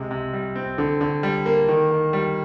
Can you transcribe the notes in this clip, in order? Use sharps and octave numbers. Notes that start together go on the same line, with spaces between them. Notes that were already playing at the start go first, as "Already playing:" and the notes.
Already playing: C3 G#3
C3
G3
C4
D3
D3
G3
A#3
D#3
D#3
G3